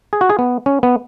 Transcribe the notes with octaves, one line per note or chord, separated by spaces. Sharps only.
G#4
F#4
G#4
B3
C#4
B3